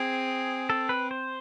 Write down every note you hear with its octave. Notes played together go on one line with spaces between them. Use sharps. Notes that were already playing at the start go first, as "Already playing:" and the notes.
Already playing: C4 G#4
A4
B4
C5